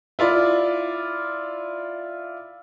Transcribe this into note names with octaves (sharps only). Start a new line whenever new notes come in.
E4 F4 D5